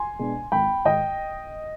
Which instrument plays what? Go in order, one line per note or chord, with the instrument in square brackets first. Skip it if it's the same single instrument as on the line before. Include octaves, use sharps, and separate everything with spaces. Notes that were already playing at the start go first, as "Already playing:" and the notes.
Already playing: [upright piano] G#5 C6
B2 G#3 D4
G#1 G5 B5
G#2 D#3 D#5 G5